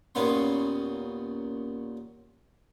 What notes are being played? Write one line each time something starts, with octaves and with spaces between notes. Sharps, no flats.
D#2 A#2 B3 C#4 C6